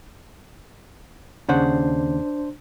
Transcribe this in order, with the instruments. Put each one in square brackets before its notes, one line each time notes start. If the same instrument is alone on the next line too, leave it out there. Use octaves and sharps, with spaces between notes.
[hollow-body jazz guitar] D#2 C#3 F#5 [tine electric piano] D4 C5